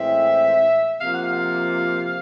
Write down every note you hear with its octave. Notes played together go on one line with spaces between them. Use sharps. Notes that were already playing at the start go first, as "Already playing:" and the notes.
Already playing: A2 E3 G#3 C4 E5
C3 F3 A#3 F5
F#5
F5